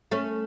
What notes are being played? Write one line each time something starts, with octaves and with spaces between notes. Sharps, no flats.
A3 C#4